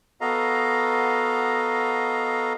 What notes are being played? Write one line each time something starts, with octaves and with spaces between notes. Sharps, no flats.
B3 F#4 A4 D#5 F5 A#5